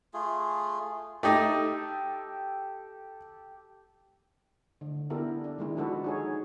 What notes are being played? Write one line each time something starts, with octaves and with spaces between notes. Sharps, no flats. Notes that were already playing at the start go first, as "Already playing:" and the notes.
A3 F4 G#4
A3 D#4 G4 A4
D3
B3 D4 E4 G4 A4 A#4
D4
D#3 G#3 E4
F3 D4 F#4 A4 B4
D#4 G#4 C#5